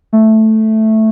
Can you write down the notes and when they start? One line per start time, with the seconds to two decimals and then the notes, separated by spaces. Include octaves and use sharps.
0.13 A3